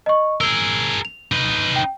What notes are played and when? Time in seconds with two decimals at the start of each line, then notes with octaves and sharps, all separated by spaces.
0.06 D#5 C#6
0.41 G#4 A#4 E6 G7
1.05 F7
1.32 D#4 B4
1.76 G5